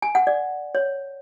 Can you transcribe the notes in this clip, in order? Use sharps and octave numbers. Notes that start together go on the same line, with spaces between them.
G#5
F#5
D5
C#5